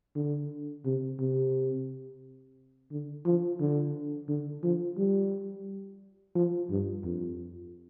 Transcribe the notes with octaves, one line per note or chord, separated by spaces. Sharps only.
D3
C3
C3
D3
F3
D3
D3
F3
G3
F3
G2
F2